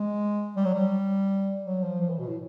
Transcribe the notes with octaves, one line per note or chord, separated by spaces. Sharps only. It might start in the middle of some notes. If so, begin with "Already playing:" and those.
Already playing: G#3
G3
F#3
G3
F#3
F3
F3
E3
B2
A2